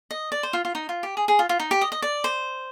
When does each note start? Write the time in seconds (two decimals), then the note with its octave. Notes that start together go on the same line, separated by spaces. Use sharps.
0.11 D#5
0.32 D5
0.43 C5
0.53 F4
0.65 F4
0.75 D#4
0.89 F4
1.03 G4
1.17 G#4
1.28 G#4
1.39 F4
1.49 F4
1.59 D#4
1.71 G4
1.81 D#5
1.92 D#5
2.02 D5
2.24 C5